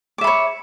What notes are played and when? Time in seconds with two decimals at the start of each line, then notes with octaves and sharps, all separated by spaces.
0.18 D6
0.21 E5
0.24 B5
0.27 C#5